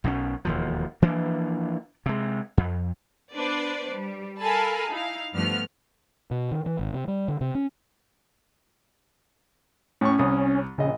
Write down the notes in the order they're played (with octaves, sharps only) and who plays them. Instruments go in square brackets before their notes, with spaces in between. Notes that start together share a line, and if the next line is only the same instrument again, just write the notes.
[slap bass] B1 B2 G3 C#4
E1 D#2 F3
E3 F3 A#3 D4
C3 G#3
F2
[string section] B3 D4 B4 C5 D5
G3
A4 A#4 F5 G#5 A5 B5
D#4 E4 F5
G2 F3 A3 B3 F6
[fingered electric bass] B2
D#3
E3
G#1
C3
G3
D3
C3
C#4
[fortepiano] A2 C#6 [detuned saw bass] C#4
[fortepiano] C2 D#6
[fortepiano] A#1 D#5 [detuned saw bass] C#3